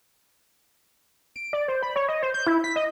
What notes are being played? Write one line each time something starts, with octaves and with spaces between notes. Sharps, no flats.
D7
D5
C5
B5
C#5
D#5
C5
G6
E4
B6
D#5